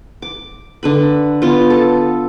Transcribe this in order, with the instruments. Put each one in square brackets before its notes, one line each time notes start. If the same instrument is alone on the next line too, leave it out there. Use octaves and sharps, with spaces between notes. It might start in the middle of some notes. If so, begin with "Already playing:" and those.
[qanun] D6
D3 B4 B5
B3 F4
A4